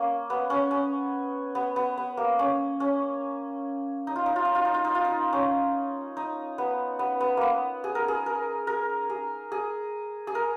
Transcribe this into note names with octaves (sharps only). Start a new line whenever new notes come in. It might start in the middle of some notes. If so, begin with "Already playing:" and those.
Already playing: A#3 C#4
B3
C#4
C#4
B3
B3
B3
A#3
C#4
C#4
D#4
F4
D#4
F4
D#4
F4
D#4
F4
D#4
F4
D#4
C#4
D#4
B3
B3
B3
A#3 B3
G#4
A#4
G#4
A#4
A#4
G#4
G#4
G#4
A#4